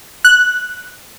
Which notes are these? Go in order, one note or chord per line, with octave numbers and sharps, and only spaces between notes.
F#6